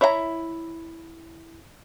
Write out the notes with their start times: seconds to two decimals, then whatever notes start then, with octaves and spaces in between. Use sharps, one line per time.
0.01 E4 C#5 E5 F5 A#5